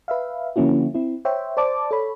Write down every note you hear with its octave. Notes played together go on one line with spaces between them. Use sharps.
B4 E5 F5
D3 F3 A#3 C#4 E4 F#4
C4 E4
C5 C#5 E5 G5
C5 D5 A5 D6
A4 C#5 B5